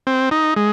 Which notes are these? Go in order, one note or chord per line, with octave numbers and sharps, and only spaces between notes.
C4
D#4
G#3